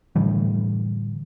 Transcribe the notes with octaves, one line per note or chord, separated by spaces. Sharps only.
A2 D3 E3 G3